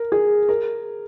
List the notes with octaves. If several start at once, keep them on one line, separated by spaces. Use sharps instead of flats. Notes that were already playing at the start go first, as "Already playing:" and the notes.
Already playing: A#4
G#4
A#4